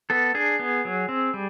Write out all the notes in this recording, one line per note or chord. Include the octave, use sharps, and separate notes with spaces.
B3 A4
D4 G#4
B3
F#3
C4
G3